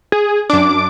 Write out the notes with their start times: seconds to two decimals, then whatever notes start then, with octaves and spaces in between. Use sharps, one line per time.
0.12 G#4
0.50 F#2 D4 D6